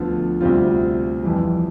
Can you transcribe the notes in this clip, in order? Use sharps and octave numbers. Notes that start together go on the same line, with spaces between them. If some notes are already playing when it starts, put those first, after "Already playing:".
Already playing: D2 D3 F3 B3 F4
D2 C3 G3 C4 F4
F2 E3 G3